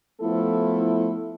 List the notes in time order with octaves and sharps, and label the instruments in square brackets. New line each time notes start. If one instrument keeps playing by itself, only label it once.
[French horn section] F3 A3 B3 E4 A4